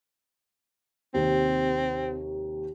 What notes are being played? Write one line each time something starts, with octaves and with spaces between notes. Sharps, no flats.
D#2 C3 C4